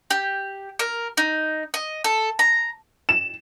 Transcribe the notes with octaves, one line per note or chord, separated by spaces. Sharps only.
G4
A#4
D#4
D#5
A4
A#5
E7